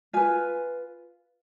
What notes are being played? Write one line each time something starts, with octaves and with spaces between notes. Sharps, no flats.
F4 B4 G#5